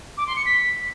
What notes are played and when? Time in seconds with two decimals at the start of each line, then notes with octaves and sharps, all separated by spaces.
0.17 D6
0.27 C6
0.36 C#7
0.46 B6